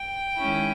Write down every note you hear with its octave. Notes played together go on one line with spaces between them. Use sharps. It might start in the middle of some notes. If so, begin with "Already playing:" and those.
Already playing: G5
D#3 G#3 C#4 E4